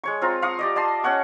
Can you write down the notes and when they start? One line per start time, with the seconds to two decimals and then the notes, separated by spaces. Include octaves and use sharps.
0.04 G#3 C#5 C#6
0.21 C4 F4 A#5
0.42 F5 C#6 D#6
0.59 G4 D5 D#5
0.76 D5 D#5 A5 C6
1.04 C#4 C#5 F#5 C#6